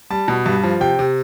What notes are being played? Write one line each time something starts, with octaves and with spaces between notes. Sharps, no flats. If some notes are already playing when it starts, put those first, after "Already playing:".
G3 A5
B2
G2
F3
C3 G5
C3